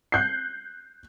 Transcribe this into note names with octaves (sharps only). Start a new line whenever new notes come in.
F#6 G6 C7